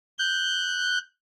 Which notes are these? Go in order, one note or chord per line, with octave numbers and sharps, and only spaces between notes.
F#6 G6